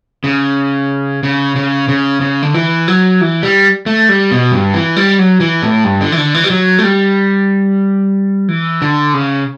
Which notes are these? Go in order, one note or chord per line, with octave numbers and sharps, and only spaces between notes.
C#3
C#3
C#3
C#3
C#3
D3
E3
F#3
E3
G3
A3
G3
B2
G2
E3
G3
F#3
E3
A2
G2
D3
E3
D3
E3
G3
F#3
A3
G3
E3
D3
C#3